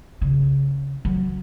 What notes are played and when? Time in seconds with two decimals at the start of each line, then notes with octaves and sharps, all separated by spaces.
0.22 C#3
1.05 F#3